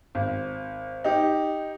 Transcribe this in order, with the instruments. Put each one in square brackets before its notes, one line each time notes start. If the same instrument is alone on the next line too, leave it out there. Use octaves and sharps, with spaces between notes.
[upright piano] G#1
D#4 G4